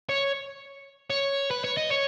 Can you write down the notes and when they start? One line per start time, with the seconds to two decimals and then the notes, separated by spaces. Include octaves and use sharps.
0.09 C#5
1.10 C#5
1.51 B4
1.64 C#5
1.77 D#5
1.91 C#5